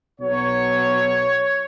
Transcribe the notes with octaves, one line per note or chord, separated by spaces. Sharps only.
B1 B2 F#3 B3 C#5